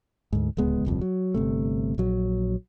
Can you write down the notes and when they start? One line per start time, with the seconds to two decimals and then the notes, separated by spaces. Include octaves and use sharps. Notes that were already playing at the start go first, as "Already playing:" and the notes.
0.33 D2 G#2
0.57 D1 C#2 G#3 B3
0.85 D#1 C2 F2
1.01 F#3
1.34 G1 C3 A3
1.98 A#1 F#3